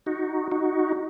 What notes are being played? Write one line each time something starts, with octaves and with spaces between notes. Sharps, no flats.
D#4 F#4
D#4 F#4